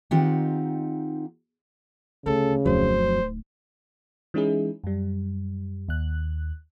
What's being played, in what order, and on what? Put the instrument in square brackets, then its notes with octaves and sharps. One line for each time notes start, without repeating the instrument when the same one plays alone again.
[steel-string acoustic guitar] D#3 C4 D#4 F4 G4 F#5
[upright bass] D2 [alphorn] C#3 [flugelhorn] A4
[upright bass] D1 D#4 [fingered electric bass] F2 F#3 [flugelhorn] C5
[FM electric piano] E3 G#3 C#4 D#4 E4 G#4
F#2 G3
D#2 F#6